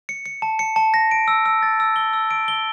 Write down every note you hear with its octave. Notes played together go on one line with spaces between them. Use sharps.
C#7
C#7
A5
C#7
A5
A#6
D7
E6
E6
A6
E6
G7
E6
D7
G7